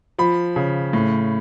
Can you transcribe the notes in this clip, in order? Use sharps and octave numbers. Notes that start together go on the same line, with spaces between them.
F3 B5
C#3
A2